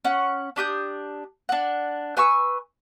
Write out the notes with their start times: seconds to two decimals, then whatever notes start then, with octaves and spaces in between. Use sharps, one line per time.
0.04 C#4 F#5
0.56 D4 G4 D#6 G6
1.49 D4 F#5
2.17 B4 G#5 C#6 E6